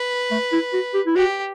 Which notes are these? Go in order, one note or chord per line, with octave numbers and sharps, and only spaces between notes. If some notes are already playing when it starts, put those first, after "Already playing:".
Already playing: B4
A3
E4
F#4
G4
E4
F#4 G4